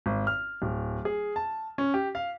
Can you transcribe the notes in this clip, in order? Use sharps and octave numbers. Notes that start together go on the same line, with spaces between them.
G#1
F6
D1
G#4
A5
C#4
G4
F5